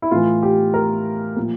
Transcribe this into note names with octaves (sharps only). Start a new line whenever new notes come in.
E4
A2 E3 F4
G4
A#4
A#2 F3